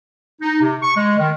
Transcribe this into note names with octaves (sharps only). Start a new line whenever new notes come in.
D#4
C3
C#6
G#3
D#3